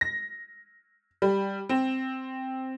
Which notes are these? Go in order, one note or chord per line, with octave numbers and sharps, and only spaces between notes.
A#6
G3
C4